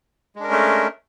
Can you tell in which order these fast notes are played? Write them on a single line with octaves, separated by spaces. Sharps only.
G#3 D4 A#4 C#4 A3